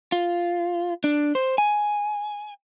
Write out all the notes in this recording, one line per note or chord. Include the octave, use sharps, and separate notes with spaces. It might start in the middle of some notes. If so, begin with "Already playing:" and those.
F4
D4
C5
G#5